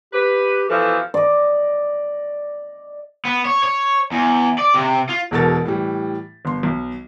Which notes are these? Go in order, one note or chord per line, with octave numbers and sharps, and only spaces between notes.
G4 B4
B2 E3 F3 A4
D5 D#5
B3
C#5
C#5
E2
D5
C3
F4
E1 E2 B2 A4 A#4 A6
A2 E3 G3
G1 C6
B1